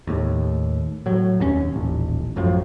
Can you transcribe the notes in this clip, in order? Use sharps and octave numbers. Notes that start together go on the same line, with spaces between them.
D#2 A2
A2 F#3
F1 D#2 B2 C#4
D#1 A1
A1 F#2 A2 F3